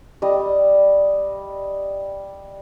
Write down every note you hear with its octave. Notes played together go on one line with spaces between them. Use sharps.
G3 D#5